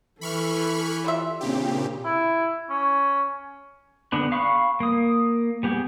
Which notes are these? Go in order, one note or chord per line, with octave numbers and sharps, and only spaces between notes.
E3 A4 B5 C#6 F6
G3 F4 E5
A#2 C#3 C4 D4 G4
E4
C#4
D3 B3 D4 B4
F5 B5 C#6 F#6
A#3 D#6
G3 B3 G4 G#4